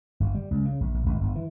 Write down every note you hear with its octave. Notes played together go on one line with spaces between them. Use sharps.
G1
G3
C#2
C#3
A#1
A#1
G#1
G1
E3